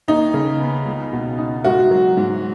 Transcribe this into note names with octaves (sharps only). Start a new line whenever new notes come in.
D#2 D#4
C#3
B3
C#2
B2
D#4
G#2 F#4
F#3
G#2